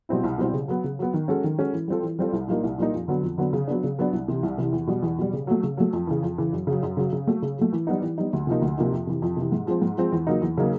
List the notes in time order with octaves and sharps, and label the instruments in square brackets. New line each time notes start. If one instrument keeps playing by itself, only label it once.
[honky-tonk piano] B2 G3 C4 E4
C2
B2 G3 C4 E4
C#3
F#3 B3
C#3
F#3 B3
D#3
G#3 C#4 F#4 A4
D#3
G#3 C#4 F#4 A4
E3
G3 C4 F4 A4
E3
G3 C4 F4 A4
C2
A#2 G3 A#3 D#4
C2
A#2 G3 A#3 D#4
F2
D3 F#3 B3
F2
D3 F#3 B3
C#3
F#3 B3 D4
C#3
F#3 B3 D4
C2
C3 E3
C2
C3 E3
E2
B2 G3
E2
B2 G3
C#3
F#3 A3
C#3
F#3 A3
F2
C#3 E3
F2
C#3 E3
F#2
C#3 F#3
F#2
C#3 F#3
C#3
F#3 A3
C#3
F#3 A3
E3
G3 B3 D#4
E3
G3 B3 D#4
D2
C3 F3 A#3 D#4
D2
C3 F3 A#3 D#4
F2
C3 E3
F2
C3 E3
G#2
F3 G#3 C4
G#2
F3 G#3 C4
E2
C#3 F#3 A#3 D#4
E2
C#3 F#3 A#3 D#4